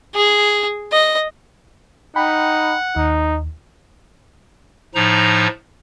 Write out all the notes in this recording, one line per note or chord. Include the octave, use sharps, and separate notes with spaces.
G#4
D#5
D#4 F#5 G5 B5
D#2 D#4
A2 F3 D#4 A#5